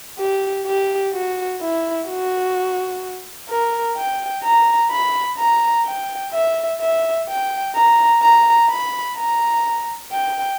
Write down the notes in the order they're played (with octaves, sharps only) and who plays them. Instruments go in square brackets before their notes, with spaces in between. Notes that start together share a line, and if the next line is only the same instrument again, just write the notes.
[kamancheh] G4
G4
F#4
E4
F#4
A#4
G5
A#5
B5
A#5
G5
E5
E5
G5
A#5
A#5
B5
A#5
G5